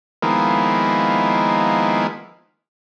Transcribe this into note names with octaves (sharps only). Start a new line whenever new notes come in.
D#3 F3 G#3 A#3 B3 E4